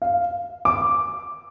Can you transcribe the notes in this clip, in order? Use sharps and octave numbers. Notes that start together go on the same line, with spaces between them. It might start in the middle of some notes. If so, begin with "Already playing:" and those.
F5
D6